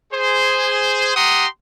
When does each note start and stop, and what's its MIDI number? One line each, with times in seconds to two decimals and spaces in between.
0.12 1.13 68
0.12 1.13 72
1.16 1.46 67
1.16 1.46 78
1.16 1.46 82
1.16 1.46 84
1.16 1.46 87